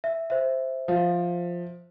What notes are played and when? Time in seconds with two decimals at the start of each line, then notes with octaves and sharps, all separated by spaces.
0.04 E5
0.30 C5 E5
0.88 F3